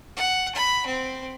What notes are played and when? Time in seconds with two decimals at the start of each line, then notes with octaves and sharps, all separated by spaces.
0.17 F#5
0.55 B5
0.86 C4